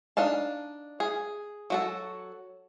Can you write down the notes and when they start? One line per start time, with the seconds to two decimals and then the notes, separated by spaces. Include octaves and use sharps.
0.17 D4 D#4 F5 A5
1.00 G#4
1.70 F#3 F#4 A4